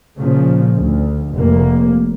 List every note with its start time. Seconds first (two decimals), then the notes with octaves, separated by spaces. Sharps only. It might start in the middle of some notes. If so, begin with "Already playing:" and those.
0.18 A#2 C#3 F3
0.77 D2
1.38 F1 A#3